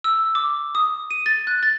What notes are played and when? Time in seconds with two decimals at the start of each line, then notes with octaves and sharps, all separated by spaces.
0.04 E6
0.35 D6
0.75 D#6
1.11 D#7
1.26 A6
1.47 F#6
1.63 A6